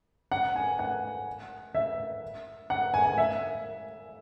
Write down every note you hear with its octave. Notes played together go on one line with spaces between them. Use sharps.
F#5
G#5
F#5
E5
F#5
G#5
G#5
E5